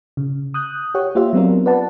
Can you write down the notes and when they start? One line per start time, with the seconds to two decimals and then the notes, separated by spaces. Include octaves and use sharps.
0.17 C#3
0.54 D#6 F#6 G6
0.94 G4 C#5 F#5
1.15 A#3 F4 G4 C5 E5
1.33 F#3 B3 C4 D4 F4 A#4
1.66 B4 D5 F#5 A5